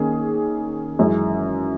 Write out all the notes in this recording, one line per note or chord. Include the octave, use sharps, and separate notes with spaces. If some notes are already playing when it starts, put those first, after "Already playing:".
Already playing: D#3 A#3 C#4 G#4
F#2 E3 G#3 C#4